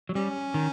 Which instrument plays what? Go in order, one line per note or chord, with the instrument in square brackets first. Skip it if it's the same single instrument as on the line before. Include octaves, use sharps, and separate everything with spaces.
[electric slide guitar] F#3
[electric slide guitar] G3 [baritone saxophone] C#4
[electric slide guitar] D#3